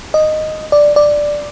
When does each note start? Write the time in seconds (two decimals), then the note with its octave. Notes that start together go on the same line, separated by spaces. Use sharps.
0.14 D#5
0.72 D5
0.96 D5